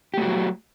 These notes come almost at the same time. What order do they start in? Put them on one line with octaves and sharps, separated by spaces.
G4 A3 F#4 F#3